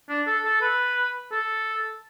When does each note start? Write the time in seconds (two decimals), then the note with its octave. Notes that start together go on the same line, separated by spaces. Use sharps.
0.09 D4
0.27 A4
0.45 A4
0.62 B4
1.32 A4